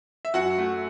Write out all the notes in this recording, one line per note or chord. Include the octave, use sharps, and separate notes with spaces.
E5
F#2 F#4 F#5
A3